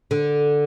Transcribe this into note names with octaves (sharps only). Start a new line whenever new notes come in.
D3